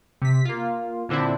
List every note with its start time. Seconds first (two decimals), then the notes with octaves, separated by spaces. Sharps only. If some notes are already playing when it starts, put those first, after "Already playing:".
0.22 C3 B6
0.45 A#3 F4
1.09 A#2 D3 C4 D4 E4